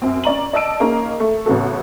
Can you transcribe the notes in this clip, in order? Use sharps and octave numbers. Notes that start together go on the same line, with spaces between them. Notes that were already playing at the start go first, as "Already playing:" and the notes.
F#2 C4
C#4 D5 A#5 F#7
D5 D#5 A5 E6 D7
A#3 C#4 D#4 G#4 A#5
A3
A1 C#3 B3 F#4 A4